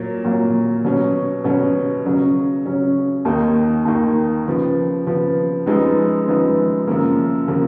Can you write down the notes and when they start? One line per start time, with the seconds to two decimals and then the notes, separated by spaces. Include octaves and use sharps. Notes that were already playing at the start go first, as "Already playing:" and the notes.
Already playing: A#2 F#3 A#3
0.25 A#2 F#3 A#3
0.85 B2 F#3 C#4
1.44 B2 F#3 C#4
2.05 C#3 F#3 C#4
2.66 C#3 F#3 C#4
3.25 D#2 D#3 A#3 D#4
3.85 D#2 D#3 A#3 D#4
4.47 C#3 F3 B3
5.06 C#3 F3 B3
5.66 F#2 F3 G#3 B3 D#4
6.27 F#2 F3 G#3 B3 D#4
6.87 F#2 C#3 F3 A#3
7.48 C#3 F3 A#3